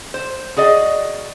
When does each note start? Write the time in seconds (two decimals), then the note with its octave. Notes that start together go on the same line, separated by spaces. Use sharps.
0.14 C5
0.57 F#4 G#4 D5 D#5